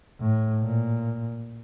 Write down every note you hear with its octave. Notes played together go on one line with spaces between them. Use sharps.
A2
A#2